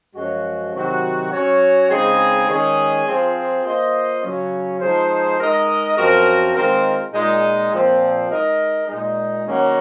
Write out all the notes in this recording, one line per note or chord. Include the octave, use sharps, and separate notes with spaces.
F#2 F3 G#3 C#4 F#4
C3 D#3 F#3 C4 F#4
F#3 C#4 F#4 C#5
C#3 G#3 C4 D#4 G#4
D#3 G#3 C#4 G#4
F3 C4 F4 G#4
A#3 F4 C5 D#5
C#3 F#3 C#4
F3 G#3 D#4 G#4 C5
G#3 D#4 A#4 D#5
F#2 F3 C4 F#4 A#4
D#3 G#3 C4 F4 A#4
A#2 G#3 D#4
A#2 F3 C4
G#3 D#4 A#4 D#5
A#2 G#3 D#4
D#3 F#3 A#3 C#4 F#4